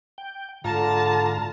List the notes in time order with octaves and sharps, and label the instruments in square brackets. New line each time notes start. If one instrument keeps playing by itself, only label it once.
[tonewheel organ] G5
[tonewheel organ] G#2 F4 A#5 [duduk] D3 [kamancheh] A5